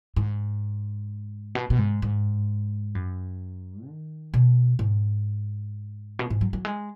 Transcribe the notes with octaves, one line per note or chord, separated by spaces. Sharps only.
G#2
B2
B2
G#2
G#2
F#2
D#3
B2
G#2
B2
G#2
F#3
F#3
G#3